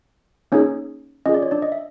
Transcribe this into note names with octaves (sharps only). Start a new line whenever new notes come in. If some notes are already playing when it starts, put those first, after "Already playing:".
A#3 C#4 D#4 G#4 C#5
C#4 F4 G#4 D#5
D5
C#5
D4 D5
D#5
E5